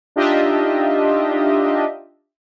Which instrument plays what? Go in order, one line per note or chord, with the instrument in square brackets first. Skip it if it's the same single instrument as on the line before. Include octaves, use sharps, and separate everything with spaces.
[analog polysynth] D4 D#4 F4 G4 D#5 E5